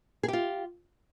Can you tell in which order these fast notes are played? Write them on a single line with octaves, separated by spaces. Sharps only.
G#4 G4 F4